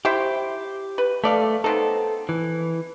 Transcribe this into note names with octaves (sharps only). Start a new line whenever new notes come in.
E4 G4 C5 G5
B4
A3 A4 D5 F5
B3 C4 D#4 A4
E3